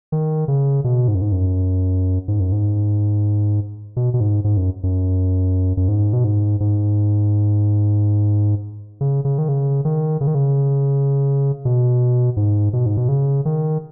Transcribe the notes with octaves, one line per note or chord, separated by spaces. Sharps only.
D#3
C#3
B2
G#2
F#2
G#2
F#2
G#2
F#2
G#2
B2
B2
G#2
G#2
F#2
F#2
F#2
G#2
B2
G#2
G#2
C#3
C#3
D#3
C#3
D#3
C#3
D#3
C#3
B2
G#2
B2
G#2
B2
C#3
D#3